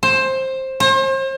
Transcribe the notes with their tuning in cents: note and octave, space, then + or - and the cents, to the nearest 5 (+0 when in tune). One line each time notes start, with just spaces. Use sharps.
C5 +15
C5 +40